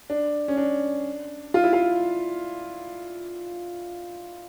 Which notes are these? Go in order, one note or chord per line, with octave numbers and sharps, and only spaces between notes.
D4
C#4
D4
F4
E4
F4